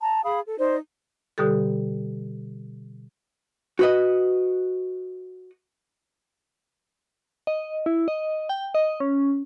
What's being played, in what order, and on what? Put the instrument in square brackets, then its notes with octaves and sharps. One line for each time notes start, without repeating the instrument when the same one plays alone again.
[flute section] A5 A#5
G#4 F5 B5 D#6
A4
D#4 C5 D5
[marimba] B2 D3 G3 G4 A4
[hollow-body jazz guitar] F#4 B4 D#5
[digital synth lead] D#5
E4
D#5
G5
D#5
C#4